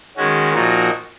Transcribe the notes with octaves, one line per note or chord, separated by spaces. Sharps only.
D#3 G#3 C#4 F#4
A#2 F3 A#3 D#4 F#4